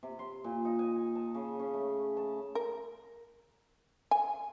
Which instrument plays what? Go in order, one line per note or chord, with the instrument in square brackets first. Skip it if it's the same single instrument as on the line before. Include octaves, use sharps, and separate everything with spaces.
[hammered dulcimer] C3
C6
A#2
D#4
G#5
A5
C#3
C#4
A3
A5
[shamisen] A#4
G#5